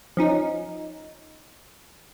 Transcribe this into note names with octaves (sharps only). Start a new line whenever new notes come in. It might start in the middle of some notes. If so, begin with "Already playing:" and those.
F3 C#4 D#4